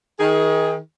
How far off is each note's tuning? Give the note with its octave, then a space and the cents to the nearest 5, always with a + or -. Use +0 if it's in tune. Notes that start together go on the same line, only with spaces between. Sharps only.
D#3 +35 G#4 +5